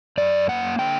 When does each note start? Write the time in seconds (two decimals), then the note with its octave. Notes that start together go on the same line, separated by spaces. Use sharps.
0.18 F#2 D5
0.49 A#3 F#5
0.79 D3 G5